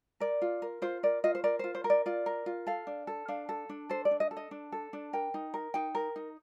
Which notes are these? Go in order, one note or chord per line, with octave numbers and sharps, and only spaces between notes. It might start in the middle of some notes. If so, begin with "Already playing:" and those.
A#4 D5
F4
A#4
F4 C5
A#4 D5
F4 D#5
C5
A#4 D5
F4 C5
C5
A#4
D5
F4 D5
A#4
F4
A4 F5
D4
A4
D4 F5
A4
D4
A4 C5
D5
D4
D#5
A4
D#5
D4
A4
D4
A#4 G5
D#4
A#4
D#4 G5
A#4
D#4